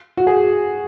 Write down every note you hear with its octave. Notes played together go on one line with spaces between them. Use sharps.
F#4
G#4